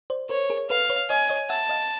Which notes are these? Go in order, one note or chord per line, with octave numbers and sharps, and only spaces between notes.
C5 D5
A#4 C5 C#5
G#4 A#4
A4 B4 F5
B4 C#5
C#5 D#5 G#5
C#5 D#5
E5 F#5 A5
D#5 F5